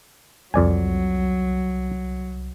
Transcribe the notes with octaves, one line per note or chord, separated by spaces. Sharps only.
C2 F2 F#3 D5 G#5